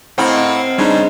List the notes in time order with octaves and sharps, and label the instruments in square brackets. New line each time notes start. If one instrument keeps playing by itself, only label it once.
[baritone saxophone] A2 [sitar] C4 [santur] A#4 D#5 F5 [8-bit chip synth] F#5 B5
[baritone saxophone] C#3 [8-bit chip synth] G3 D4 D#4 [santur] G#3